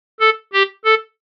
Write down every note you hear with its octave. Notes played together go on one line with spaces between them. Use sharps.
A4
G4
A4